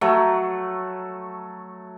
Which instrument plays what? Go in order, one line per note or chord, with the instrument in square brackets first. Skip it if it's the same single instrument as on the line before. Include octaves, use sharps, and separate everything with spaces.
[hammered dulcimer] F#3 A3